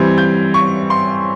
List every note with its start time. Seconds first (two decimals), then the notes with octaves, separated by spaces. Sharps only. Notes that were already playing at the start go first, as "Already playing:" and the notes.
Already playing: E3 G3 C4 G#6
0.18 G6
0.54 C#6
0.90 C6